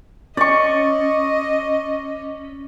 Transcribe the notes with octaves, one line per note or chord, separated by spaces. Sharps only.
C#4 D5 D#5 C#6